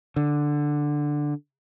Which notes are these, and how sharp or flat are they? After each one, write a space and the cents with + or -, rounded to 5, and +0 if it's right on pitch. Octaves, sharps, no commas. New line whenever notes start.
D3 +5